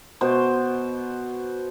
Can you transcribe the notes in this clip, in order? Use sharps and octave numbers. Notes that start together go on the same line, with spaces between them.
B2 C5